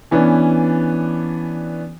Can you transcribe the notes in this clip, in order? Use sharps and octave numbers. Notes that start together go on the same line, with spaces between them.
E3 B3 C#4 D4